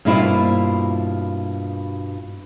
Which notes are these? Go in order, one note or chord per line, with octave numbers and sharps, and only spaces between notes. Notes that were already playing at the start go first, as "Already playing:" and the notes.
G2 B2 A#3 E4 F4 C5